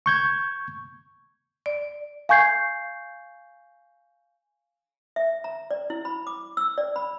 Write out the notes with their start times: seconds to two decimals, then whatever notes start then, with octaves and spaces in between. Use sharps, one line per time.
0.06 C#6 G6 G#6
1.66 D5
2.29 F5 G#5 C#6 G6 G#6 C7
5.16 E5
5.44 A#5
5.71 D5
5.90 E4
6.05 B5
6.27 D6
6.57 E6
6.78 D5
6.96 B5